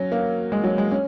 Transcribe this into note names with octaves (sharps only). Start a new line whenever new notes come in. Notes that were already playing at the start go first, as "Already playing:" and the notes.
Already playing: F#3 C#4
A#3
G#3
F#3
G#3
C#4